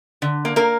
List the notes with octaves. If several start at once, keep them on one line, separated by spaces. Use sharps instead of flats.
D3
A#3
A#3 A#4